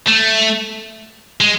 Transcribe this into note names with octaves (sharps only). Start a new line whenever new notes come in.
A3
G#3